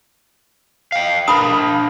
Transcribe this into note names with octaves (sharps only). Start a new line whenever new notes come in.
F5 G5
D4 A#4 B5 D#6